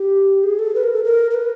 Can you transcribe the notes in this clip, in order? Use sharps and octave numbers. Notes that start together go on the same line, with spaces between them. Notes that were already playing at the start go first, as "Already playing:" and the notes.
Already playing: G4
G#4
A4
B4
A#4
A4
A#4
A#4
B4